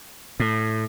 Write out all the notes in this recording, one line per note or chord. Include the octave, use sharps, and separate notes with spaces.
A2